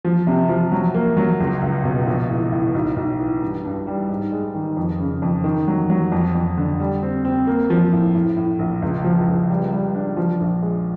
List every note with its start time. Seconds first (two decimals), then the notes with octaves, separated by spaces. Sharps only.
0.05 F3
0.27 C3
0.49 F3
0.72 F#3
0.94 A#3
1.17 F#3
1.40 C#2
1.62 C#2
1.84 B2
2.07 A#1
2.30 A2
2.52 A2
2.75 B1
2.96 B1
3.19 E3
3.42 G2
3.64 G2
3.87 G3
4.09 G#2
4.32 G#3
4.55 D#3
4.77 F2
5.00 C#3
5.22 F2
5.44 D#3
5.68 F#3
5.90 F#3
6.12 F2
6.35 F2
6.57 D3
6.80 G3
7.03 C4
7.25 C4
7.47 A#3
7.70 F3
7.92 A2
8.15 A2
8.37 A2
8.59 A#1
8.82 C#2
9.04 F3
9.28 C#2
9.50 G3
9.72 G3
9.94 D4
10.17 F3
10.40 A#1
10.63 G#3